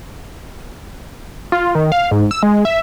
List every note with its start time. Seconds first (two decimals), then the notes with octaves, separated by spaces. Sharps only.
1.52 F4
1.75 D#3
1.92 F5
2.11 G#2
2.31 E6
2.43 G#3
2.65 E5